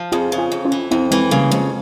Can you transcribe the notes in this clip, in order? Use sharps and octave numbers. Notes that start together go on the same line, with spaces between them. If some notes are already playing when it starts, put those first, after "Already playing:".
Already playing: F3
F2 F4 G#4
C#3
F4 G#4
F2
C#4 F4
E3
F2 C4 E4
E3 G#3 C4
C#3 G3 A#3
F2 F3 G#3